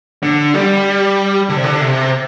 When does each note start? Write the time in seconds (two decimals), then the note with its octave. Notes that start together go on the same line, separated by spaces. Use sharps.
0.23 D3
0.54 G3
1.49 D3
1.57 C3
1.64 D3
1.81 C3